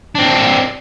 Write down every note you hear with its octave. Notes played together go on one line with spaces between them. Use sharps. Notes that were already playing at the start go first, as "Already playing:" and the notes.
C4 D4